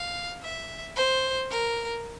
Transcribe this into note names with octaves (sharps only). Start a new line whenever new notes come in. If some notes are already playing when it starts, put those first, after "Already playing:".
Already playing: F5
E5
C5
A#4